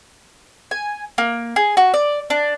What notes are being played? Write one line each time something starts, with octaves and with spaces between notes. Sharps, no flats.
G#5
A#3
G#4
F#4
D5
D4